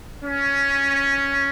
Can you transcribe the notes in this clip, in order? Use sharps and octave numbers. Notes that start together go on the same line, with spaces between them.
C#4